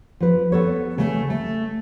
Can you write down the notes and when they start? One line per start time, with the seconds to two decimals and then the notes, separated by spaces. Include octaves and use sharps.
0.20 F3 B4
0.52 B3 A4 C#5
0.98 C#3 A3
1.30 A3